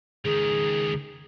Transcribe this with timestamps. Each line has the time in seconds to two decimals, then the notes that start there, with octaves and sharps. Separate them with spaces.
0.25 C#2 D#3 G#4